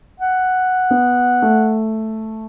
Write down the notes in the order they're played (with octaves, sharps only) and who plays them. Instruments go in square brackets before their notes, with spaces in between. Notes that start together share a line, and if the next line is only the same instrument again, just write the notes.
[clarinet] F#5
[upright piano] B3
A3